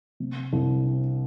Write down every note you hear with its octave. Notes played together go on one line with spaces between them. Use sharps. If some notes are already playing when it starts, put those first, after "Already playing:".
C3
C2
C4